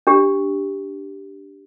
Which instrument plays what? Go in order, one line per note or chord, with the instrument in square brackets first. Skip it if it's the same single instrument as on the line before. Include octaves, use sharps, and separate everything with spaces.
[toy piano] D4 G4